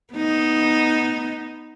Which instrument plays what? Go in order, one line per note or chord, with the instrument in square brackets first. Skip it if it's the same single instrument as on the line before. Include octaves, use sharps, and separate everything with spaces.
[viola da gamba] B3 D#4